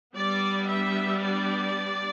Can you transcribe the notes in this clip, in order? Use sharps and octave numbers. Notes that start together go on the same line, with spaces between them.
G3 B3 D4 D5
E5
D5